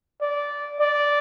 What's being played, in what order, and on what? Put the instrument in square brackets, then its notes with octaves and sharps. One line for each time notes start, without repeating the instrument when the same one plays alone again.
[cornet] D5
D5